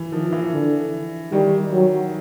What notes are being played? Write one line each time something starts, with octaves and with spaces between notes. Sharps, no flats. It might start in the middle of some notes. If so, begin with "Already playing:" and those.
Already playing: E3
D#3 F3
E3
D3
D#3 G3
F#3